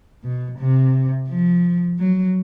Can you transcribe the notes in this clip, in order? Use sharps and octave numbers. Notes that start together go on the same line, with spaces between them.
B2
C3
F3
F#3